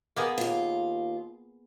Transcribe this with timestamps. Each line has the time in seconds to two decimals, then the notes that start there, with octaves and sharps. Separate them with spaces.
0.16 A#3 B3 G#4
0.38 D#2 F4